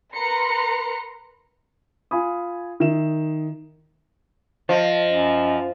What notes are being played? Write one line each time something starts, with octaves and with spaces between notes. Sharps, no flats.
A#4 B4 A#5 C6 C#7
F4 G#5 B5 D#6
D#3 E5 E7
F3 D#5
F#2